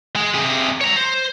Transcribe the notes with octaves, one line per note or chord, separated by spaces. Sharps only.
G#3
C3 G#4
C#5 A#5
C5